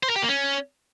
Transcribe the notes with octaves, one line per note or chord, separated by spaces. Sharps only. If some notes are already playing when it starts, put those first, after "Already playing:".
C5
A#4
G4
A#3
C#4